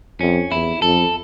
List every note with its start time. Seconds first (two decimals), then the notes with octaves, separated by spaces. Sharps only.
0.20 F2 C#4
0.51 E2 E4
0.82 F2 A4